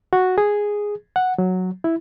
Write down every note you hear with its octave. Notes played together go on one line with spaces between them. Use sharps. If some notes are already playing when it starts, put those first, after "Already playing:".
F#4
G#4
F#5
F#3
E4